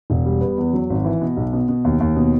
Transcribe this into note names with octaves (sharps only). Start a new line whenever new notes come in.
E1
G3
B3
E2
F#3
G#1
E3
B2
B1
B2
B2
D#2
D#2
B2